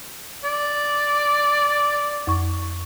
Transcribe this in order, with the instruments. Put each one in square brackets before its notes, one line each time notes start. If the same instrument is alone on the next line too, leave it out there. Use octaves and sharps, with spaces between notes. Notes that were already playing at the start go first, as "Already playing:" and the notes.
[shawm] D5
[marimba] F2 C#6